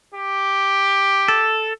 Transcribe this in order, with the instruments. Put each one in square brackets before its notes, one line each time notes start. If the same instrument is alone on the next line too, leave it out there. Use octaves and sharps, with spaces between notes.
[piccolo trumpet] G4
[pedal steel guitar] A4